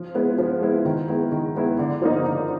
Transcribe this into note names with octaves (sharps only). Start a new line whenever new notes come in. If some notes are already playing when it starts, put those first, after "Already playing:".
Already playing: F3
G#3 B3 E4
F3
G#3 B3 E4
D#3
G#3 B3 E4
D#3
G#3 B3 E4
D3
F3 A#3 D#4
D3